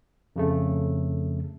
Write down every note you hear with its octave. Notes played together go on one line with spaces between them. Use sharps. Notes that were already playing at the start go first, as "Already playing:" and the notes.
F2 C#3 A3